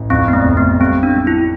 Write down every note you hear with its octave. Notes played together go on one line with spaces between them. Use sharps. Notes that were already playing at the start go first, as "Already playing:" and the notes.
Already playing: A1 A2
F2 C4
B3
A3
F1
B3
G3 C4
D4
G3
E4